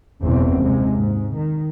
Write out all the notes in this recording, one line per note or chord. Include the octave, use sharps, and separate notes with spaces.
F#1 E2 B2 E3 C4
D#2 C3 G#3
G#2
D#3